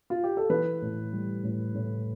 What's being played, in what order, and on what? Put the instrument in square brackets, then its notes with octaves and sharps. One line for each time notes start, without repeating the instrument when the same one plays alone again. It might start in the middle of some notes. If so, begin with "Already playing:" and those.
[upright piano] F4
G4
A4
E3 B4
A2
G3
A2
A2